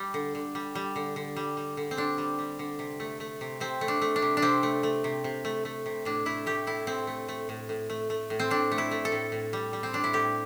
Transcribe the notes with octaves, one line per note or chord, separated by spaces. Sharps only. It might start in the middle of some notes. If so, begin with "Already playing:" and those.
Already playing: G3
D3
D3
G3
G3
D3
D3
G3
G3
D3
C4
D3 D4
G3
G3
D3
C3
A3
A3
C3
C3 C4
A3
D4
A3
D4
C3
D4
C3 C4
A3
A3
C3
C3
A3
A3
C3
A2 D4
A3 E4
A3 G4
A2 E4
A2 C4
A3
A3
A2
A2
A3
A3
A2
C4
A2 D4
A3
E4
A3
A4
A2
A2
G3
G3
C4
A2 D4
E4
A2 G4